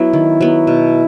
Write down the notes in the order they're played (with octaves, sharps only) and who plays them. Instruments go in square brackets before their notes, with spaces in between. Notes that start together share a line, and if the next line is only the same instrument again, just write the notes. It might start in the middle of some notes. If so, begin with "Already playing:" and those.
Already playing: [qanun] F#3 B3 [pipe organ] E4
[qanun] D#3
F#3 B3
B2